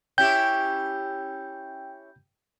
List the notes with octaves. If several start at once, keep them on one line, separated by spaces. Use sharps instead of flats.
C#4 E4 G4 G5 G6